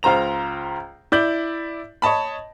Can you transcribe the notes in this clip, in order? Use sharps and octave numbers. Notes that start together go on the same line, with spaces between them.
C#2 F4 C5 A#5 F7
E4 D5 G6 F#7
C#5 D#5 A5 B5